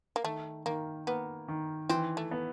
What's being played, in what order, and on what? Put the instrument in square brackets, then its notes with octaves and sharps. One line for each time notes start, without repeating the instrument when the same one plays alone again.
[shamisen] A#3
[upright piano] D#3 [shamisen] A3
[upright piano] D#3 [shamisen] A#3
[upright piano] A#3 [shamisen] B3
[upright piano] D#3
[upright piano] E3 [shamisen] C4
[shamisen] A3
[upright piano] B3